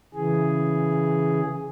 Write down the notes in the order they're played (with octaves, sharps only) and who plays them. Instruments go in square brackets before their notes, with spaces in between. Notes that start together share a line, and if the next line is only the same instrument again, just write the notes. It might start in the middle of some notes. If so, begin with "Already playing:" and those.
[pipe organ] C#3 E3 G#4